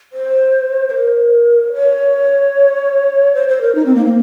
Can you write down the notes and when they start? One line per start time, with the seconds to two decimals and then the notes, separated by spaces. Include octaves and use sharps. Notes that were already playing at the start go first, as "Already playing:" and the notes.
0.13 C5
0.89 C5
0.94 A#4
1.73 C#5
3.35 C5
3.48 C5
3.61 A#4
3.75 D#4
3.86 C4
3.95 A#3
4.05 A#3